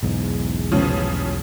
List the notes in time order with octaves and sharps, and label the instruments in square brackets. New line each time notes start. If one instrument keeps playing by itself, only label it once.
[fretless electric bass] B1 E2 G#2
[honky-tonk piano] F1 C#3 F3